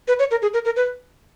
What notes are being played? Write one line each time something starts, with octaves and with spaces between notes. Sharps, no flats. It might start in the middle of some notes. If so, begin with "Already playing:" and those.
B4
C#5
A#4
G#4
A#4
A#4
B4